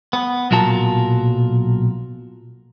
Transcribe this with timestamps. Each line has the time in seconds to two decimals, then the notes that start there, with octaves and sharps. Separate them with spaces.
0.13 B3
0.51 B1 A#2 F#3 F4 A#4 A5